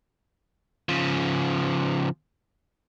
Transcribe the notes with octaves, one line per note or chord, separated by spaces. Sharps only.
C#3 F3